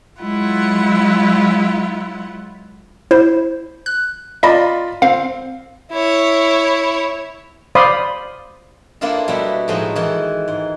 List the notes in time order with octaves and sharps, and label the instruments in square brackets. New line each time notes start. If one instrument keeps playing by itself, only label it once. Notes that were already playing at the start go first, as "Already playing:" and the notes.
[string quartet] F#3 G#3 E4 F4 F#5
[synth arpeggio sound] E4 C5
F#6
[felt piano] F4 D5 B5 [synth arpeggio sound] D#5
[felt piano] C4 [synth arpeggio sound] F5
[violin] E4 C#5
[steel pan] C5 D5 F5 B5 C6 D#6
[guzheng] A#3 B3 D4 E4 F4 A4
B2 G3 B3 E4
A2 F3 G#3 D#4 F4 F#4
D#3 E3
G#2